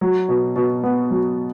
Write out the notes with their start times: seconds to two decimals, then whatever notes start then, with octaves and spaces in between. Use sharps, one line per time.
0.01 F#3
0.29 B2
0.56 B2
0.83 B3
1.10 F#3